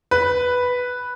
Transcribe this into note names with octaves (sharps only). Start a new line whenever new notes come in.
B4